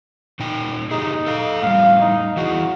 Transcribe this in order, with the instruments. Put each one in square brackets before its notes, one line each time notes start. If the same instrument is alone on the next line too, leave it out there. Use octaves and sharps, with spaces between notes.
[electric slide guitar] A#2 D#4 G5
[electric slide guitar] A#2 G4 G#4 [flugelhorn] D#4
[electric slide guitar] A4 F5
[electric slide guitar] A2 F3 G3 [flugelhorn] F5
[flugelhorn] D#4
[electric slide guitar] E3 E4 G#4 [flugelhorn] F#4